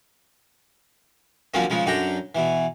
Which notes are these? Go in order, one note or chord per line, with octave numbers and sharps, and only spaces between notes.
D3 F3 F#3 A#3 C4 C#4
C#3 F3 G#3
F#2 D3 D4 G5 A#5
B2 E3